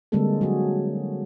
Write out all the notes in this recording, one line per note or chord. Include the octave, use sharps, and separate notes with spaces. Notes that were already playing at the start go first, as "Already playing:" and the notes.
D3 G3 G#3 A#3 C4 A4
F#3 F#4 G#4